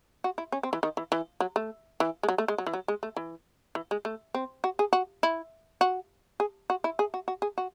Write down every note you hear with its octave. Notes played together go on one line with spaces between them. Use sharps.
F#4
E4
C#4
C4
E3
D#3
E3
E3
F#3
A3
E3
G#3
F#3
A3
G#3
F#3
E3
F#3
G#3
A3
E3
E3
G#3
A3
C4
F#4
G#4
F#4
E4
F#4
G#4
F#4
E4
G#4
F#4
F#4
G#4
F#4